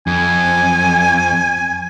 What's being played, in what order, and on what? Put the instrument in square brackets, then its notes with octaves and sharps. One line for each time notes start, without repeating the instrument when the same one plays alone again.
[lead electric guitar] F2 [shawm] G#5